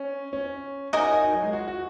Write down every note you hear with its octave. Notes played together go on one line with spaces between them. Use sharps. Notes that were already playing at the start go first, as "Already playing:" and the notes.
Already playing: C#4
C#4
D#4 A#4 D#5 G#5
F#4
D#4
D#4
F#3
G#3
F#4
F#4